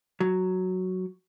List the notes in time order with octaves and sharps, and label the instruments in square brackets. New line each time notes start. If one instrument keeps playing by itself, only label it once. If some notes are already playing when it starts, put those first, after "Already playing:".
[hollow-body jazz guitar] F#3